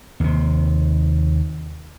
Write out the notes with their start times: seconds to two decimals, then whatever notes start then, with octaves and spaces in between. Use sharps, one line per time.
0.20 D#2 C3